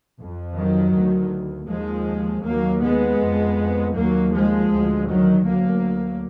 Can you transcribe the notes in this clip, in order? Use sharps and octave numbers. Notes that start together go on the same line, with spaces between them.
F2
D#3 F#3
D2
D#2 F3 G#3
D#2 F#3 A#3
G#3 B3
F2
D#2 F#3 A#3
F3 G#3
D2
D#3 F#3
D2 F#3 A#3